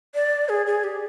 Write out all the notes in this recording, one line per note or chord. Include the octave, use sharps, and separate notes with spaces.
D5
G#4
G#4
G4